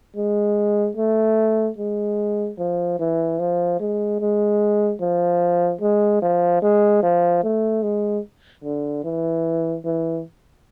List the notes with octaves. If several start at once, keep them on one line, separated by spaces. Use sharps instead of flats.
G#3
A3
G#3
F3
E3
F3
G#3
G#3
F3
G#3
F3
G#3
F3
A3
G#3
D3
E3
E3